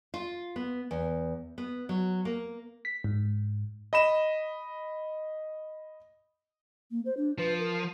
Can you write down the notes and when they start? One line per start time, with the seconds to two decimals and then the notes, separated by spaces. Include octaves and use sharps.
0.14 F4
0.56 B3
0.91 E2
1.58 B3
1.89 F#3
2.25 A#3
2.85 B6
3.04 G#2
3.93 D#5 B5 E7
6.91 A#3
7.05 C5
7.17 D4
7.38 F3 B4
7.59 A#4